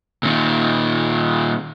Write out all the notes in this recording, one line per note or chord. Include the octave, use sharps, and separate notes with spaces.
A#2 D#3